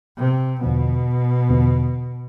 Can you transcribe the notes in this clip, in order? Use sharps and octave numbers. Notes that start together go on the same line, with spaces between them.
C3
E2 B2 D3 F3 B3
E2 D3 F3 B3